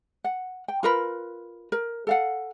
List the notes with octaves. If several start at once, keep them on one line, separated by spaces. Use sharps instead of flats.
F#5
G5
F4 A#4 B4
A#4
A4 F5 F#5